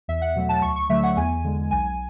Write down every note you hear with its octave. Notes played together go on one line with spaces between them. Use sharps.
E2 E5
F#5
B2 F#3 A3
A5
D2 C#6
C#6
D3 F#3 A3 E5
F#5
E2 G#5
D3 G#3
B1 G#5